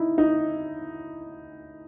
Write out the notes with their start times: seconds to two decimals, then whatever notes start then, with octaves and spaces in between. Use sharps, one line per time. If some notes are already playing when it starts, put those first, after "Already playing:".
Already playing: D#4 E4
0.18 D#4